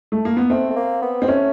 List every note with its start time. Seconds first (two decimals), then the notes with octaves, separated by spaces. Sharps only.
0.12 A3
0.25 A#3
0.37 B3
0.50 A3 C4
0.71 A3
0.76 A#3
1.02 B3
1.22 C4
1.28 A3 C#4